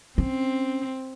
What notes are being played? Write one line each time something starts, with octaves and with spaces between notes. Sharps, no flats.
C4 C#4